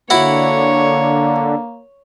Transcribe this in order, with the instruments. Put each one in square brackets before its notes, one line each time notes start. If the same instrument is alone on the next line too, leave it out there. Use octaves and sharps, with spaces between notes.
[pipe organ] D3 [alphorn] A#3 [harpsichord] E4 F#4 [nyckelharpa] C#5